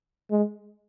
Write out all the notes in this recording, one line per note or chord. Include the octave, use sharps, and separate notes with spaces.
G#3